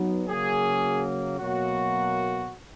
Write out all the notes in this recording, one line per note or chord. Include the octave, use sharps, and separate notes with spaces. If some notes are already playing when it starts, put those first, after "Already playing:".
Already playing: F#3 B3 D#4
C#3 F#3 A#3 G#4
B2 F#3 A#3 F#4